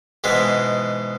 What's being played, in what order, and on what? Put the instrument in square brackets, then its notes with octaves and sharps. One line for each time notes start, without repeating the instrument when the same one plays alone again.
[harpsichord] G#2 B2 E3 G#3